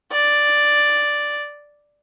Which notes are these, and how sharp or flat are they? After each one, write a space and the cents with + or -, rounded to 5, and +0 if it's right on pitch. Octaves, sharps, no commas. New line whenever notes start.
D5 +0